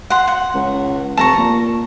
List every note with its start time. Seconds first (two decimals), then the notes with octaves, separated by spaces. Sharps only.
0.10 F#5 C6
0.28 F#5
0.55 C#2
1.17 F1 A5 A#5 C#6
1.37 A#2